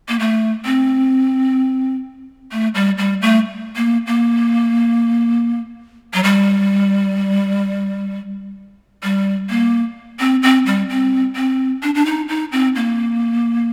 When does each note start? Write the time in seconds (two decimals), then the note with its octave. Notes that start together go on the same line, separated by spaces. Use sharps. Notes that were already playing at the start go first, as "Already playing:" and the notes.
0.09 A#3
0.19 A3
0.65 C4
2.52 A3
2.75 G3
2.98 G3
3.22 A3
3.76 A#3
4.07 A#3
6.14 F#3
6.24 G3
9.03 G3
9.50 A#3
10.20 C4
10.43 C4
10.66 G3
10.90 C4
11.36 C4
11.83 D4
11.95 D4
12.06 D#4
12.29 D#4
12.52 C4
12.76 A#3